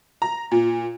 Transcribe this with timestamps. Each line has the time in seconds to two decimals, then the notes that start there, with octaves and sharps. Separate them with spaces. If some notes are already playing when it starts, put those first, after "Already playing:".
0.22 A#5
0.52 A#2